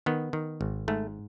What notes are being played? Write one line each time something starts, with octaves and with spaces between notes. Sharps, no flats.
D#3 B3
D#3
G#1
G#2 A3